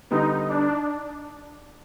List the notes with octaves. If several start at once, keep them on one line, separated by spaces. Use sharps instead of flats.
D3 G3 B3 D#4
D4